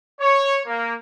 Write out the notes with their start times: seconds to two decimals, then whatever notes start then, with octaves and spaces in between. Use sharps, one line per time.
0.20 C#5
0.66 A#3